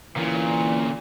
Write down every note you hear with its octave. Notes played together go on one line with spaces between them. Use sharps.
A#2 D3 E3 C#4